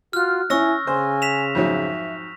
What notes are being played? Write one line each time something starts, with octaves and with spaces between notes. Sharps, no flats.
F4 F#4 F6 F#6
C#4 E4 G#5 C#6 E6 A#6
C#3 C5 G#5
B6 E7 F7
F2 G#2 F#3 E5